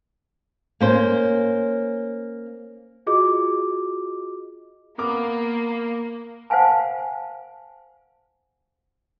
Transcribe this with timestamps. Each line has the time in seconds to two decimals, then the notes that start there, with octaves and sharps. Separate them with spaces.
0.80 A#3 C#4 C5
3.07 F4 F#4 G#4 D#5 D6
4.98 A#3 B3 A#4 D6
6.50 C5 F5 F#5 G#5 A5